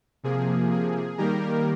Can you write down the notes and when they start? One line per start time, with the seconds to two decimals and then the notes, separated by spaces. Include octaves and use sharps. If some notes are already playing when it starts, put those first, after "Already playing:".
0.23 C3 F3 A#3 G#4
0.71 G#4
1.18 D#3 G3 A#3 G4 A#4